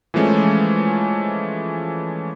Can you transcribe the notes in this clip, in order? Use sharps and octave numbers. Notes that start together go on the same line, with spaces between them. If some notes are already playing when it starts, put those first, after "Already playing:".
E3 F3 G#3 A3 C#4